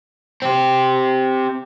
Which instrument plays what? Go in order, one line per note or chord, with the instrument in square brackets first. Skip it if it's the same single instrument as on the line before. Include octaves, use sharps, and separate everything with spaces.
[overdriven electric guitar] C4 G4